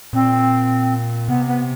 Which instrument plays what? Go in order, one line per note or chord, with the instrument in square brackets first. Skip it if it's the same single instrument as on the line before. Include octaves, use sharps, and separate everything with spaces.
[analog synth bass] A#2 [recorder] C4
[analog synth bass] C3 [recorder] B3
[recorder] B3